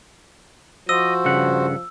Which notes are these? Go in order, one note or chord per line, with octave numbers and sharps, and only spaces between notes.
F3 F#4 C5 D#5 E6
G2 C#3 F#5